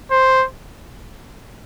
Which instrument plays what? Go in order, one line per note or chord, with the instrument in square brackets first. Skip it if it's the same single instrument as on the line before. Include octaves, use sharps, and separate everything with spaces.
[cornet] C5